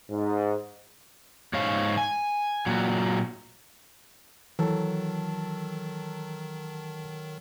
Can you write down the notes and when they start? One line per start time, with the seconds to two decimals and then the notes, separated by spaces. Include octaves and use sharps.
0.10 G#2
1.53 G#2 C#5 F5
1.97 G#5
2.66 A#2 F#3
4.59 D#3 E3 F#3 A4